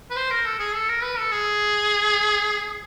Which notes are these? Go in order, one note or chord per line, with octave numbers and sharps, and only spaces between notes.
B4
C5
A#4
A4
G#4
A4
A#4
B4
A4
G#4